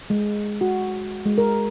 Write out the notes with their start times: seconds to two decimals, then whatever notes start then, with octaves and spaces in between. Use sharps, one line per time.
0.10 G#3
0.61 F#4
1.25 G#3
1.38 A#4